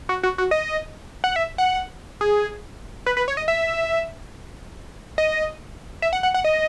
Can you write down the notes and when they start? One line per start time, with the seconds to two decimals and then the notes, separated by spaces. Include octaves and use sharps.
0.09 F#4
0.23 F#4
0.38 F#4
0.51 D#5
1.24 F#5
1.36 E5
1.58 F#5
2.21 G#4
3.06 B4
3.17 B4
3.28 C#5
3.37 D#5
3.48 E5
5.18 D#5
6.02 E5
6.13 F#5
6.23 F#5
6.34 F#5
6.44 D#5